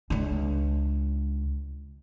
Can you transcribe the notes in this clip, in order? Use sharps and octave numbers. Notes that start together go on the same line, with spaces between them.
C#2 D4